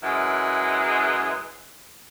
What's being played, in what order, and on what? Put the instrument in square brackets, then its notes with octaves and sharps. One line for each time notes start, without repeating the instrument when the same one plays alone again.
[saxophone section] F#2 E3 G#3